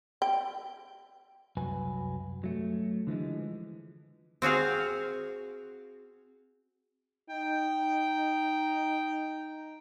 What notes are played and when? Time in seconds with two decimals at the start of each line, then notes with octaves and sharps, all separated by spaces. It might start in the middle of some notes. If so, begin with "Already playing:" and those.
0.22 G5
1.57 C2 F#2 F#3 B4 G#5
2.44 F#3 A3
3.07 D3 E3 F3 G#3
4.42 C4 F#4 G#4 F5
7.29 D#4 G5